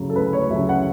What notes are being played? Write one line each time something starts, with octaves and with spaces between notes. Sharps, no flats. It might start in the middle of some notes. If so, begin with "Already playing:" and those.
Already playing: D2 C#3 F#3
A4
D2 B4
C#5
C#3 F#3 E5
F#5